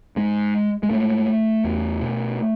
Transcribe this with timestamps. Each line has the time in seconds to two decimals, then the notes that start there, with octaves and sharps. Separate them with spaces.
0.16 G#2 G#3
0.83 G#3
0.90 G#2 A3
1.64 E2
2.01 B2